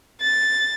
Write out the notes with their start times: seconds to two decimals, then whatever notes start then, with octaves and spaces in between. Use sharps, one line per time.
0.21 A6